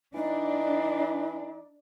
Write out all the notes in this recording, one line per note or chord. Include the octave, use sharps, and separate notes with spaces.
E3 D4 D#4